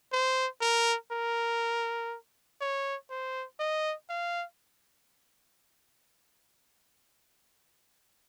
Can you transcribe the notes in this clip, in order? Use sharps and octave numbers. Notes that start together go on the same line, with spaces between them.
C5
A#4
A#4
C#5
C5
D#5
F5